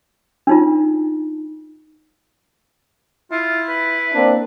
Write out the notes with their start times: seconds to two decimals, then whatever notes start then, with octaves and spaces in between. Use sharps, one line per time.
0.47 D4 D#4 F4
3.32 E4 F4
3.69 B4
4.14 A#3 C4 D4